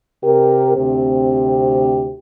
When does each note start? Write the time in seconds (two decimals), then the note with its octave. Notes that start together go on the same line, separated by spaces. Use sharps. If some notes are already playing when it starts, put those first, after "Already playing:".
0.23 C3 G4 A#4
0.75 D2 C3 C4 G4